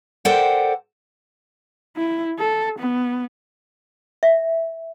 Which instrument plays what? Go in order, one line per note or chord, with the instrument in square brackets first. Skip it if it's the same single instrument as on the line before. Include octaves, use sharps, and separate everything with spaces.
[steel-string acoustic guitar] A4 A#4 C5 D5 F#5 G5
[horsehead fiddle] E4
A4
B3
[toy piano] E5